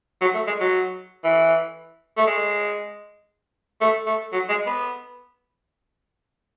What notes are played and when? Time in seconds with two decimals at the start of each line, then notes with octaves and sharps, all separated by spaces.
0.21 F#3
0.34 A3
0.47 G#3
0.60 F#3
1.24 E3
2.17 A3
2.27 G#3
3.81 A3
4.06 A3
4.32 F#3
4.49 G#3
4.66 B3